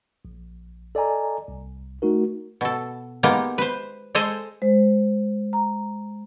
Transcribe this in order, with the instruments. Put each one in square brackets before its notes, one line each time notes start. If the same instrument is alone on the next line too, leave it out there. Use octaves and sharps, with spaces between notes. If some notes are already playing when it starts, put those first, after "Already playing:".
[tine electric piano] A#1
A4 D5 D#5 G#5 A#5
C2
A3 D#4 F#4 A#4
[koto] B2 A4
G#3 A#3 B3 D#4 G4
B4 C5
G#3 G#4 A4 C5 D#5
[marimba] G#3 C5
A#5